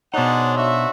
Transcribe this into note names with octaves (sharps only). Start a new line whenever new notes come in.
B2 D4 D#4 G#4 C5 C#5 F#5
D4 F#4 E5 F5